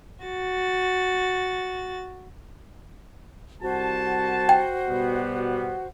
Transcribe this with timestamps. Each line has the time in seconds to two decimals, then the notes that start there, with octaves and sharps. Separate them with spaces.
0.25 F#4 A6
3.62 C2 F#4 C5 F#5 A5
4.49 G5
4.88 B2 G3 B3